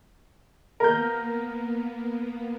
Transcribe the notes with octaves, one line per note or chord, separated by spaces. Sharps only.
A#3 B3 A#4 G6